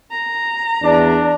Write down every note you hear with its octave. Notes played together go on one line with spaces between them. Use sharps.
A#5
E2 D4